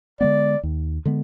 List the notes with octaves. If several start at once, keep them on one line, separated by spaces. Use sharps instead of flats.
D3 G#3 B3 D5
D#2
D3 G#3 B3